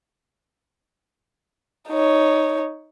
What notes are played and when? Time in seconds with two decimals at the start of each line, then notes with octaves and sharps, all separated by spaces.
1.89 D#4 C#5